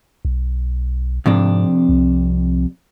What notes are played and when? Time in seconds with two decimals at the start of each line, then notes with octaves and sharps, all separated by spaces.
0.25 B1
1.26 F2 G#2 C3 D4
1.89 C2